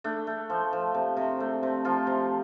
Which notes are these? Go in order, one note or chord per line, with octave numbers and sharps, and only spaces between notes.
A3 D4
A3
F3
F3
C3
C3
A3
C3
F3 F4
C3